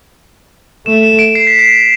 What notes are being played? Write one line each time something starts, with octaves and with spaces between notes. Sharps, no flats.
A3 E7
E7
D7
C7
B6
C7